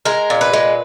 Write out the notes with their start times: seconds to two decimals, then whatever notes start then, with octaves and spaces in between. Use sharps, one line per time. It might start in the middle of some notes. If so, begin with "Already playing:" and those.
0.05 G#3 A#4
0.30 A#2
0.41 B4
0.53 G#3